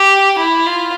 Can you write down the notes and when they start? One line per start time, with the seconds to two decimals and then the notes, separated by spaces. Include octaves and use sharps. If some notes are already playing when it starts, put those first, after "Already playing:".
Already playing: G4
0.38 E4
0.66 F4